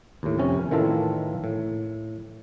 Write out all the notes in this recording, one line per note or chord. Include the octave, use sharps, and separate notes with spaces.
D#2 A2
F2 C3 C#4
A2 D#3 E3 A#3 F4 A4
A2